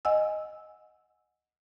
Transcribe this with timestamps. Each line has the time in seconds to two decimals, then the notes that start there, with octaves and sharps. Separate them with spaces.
0.05 D#5 F#5 G#5 E6